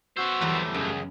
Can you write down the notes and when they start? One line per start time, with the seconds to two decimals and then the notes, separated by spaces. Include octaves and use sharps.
0.17 B3 F#4 C5 E6
0.41 E2 F#3 G3 A3 B4
0.74 C#2 F#2 G#4